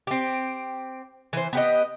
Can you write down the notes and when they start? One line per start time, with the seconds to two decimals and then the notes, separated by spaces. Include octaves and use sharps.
0.07 C4 G4
1.33 E3 C5
1.53 B3 G4 D#5